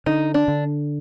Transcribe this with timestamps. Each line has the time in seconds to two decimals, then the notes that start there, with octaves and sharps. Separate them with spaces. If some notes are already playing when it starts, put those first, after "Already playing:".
0.06 D3 D#4
0.34 D4
0.48 D3